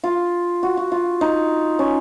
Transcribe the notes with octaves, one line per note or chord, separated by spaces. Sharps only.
F4
F#4
F#4
F4
D#4
C#4